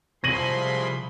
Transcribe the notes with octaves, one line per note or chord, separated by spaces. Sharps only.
C2 F3 G#4 B5 C6 A#6 D#7 F#7